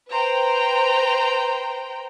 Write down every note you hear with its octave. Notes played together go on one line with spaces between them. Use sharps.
B4 C5 G5 A#5